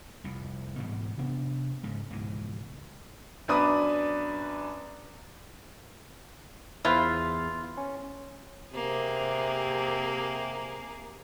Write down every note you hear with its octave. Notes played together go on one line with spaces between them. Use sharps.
C2 F2
G#2 B2 E3 G3
C3 B3 D4
G#2 C#3
C#2 G#2 B2 E3
F#2 B3 D4 B4 D5 D#6
E2 E4 F4 B4 C5
C#4
C3 A#3 G#4